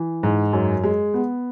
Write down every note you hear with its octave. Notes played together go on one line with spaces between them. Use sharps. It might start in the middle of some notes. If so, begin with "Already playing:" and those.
Already playing: E3
G#2
F#2
G#3
B3